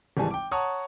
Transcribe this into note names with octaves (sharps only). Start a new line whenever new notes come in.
G#1 E3 G3 G#3 G#5 A5
G5 D6
C#5 F#5 A5 A#5 C#6 D#6